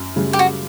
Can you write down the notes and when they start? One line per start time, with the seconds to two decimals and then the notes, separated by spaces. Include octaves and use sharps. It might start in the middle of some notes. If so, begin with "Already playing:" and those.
Already playing: F#2
0.16 C#3 G3
0.33 G4
0.39 F#4